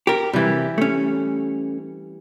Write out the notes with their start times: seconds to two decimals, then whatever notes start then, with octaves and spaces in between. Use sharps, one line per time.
0.07 G4 A#4
0.33 C3 E3 G3
0.78 A3 C#4